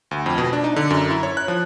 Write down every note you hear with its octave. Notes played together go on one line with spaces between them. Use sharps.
D2
F2
B2
D4
D#4
D3
F#2
E4
C#5
F#6
F3